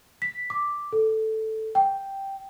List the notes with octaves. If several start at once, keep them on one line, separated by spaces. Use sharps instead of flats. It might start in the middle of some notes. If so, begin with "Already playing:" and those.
B6
D6
A4
G5